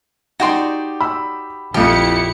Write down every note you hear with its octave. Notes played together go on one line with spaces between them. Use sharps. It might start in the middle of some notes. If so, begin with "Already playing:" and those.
D#4 F#4 G4 D5 G5 C6
B5 E6
A#1 F2 F3 E4 G4 C#7